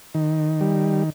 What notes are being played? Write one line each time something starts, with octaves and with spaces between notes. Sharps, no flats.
D#3
G3